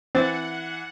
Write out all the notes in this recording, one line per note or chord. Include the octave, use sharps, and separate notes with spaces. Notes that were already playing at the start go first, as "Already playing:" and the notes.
E3 C4 F#5 A6